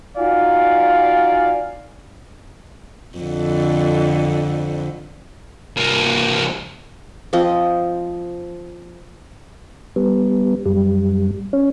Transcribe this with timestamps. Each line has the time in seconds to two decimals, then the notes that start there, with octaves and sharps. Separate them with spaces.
0.18 D#4 F4 F#4 D5 F5 G#5
3.18 F2 D3
5.77 C2 A#3
7.33 F3 C4 D#5
9.96 G3 B3
10.66 F#2 G3
11.53 C#4